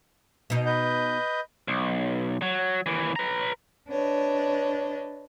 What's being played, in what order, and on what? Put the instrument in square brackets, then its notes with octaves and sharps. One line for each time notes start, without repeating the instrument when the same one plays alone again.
[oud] B2 D#4
[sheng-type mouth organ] B4 D#5 G6
[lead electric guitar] B1
F#3
D#2 E3
B4 A#5
[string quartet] D4 B4 C#5 D#5